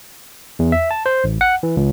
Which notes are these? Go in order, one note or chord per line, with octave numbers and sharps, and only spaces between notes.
E2
E5
A5
C5
A1
F#5
E3
C#2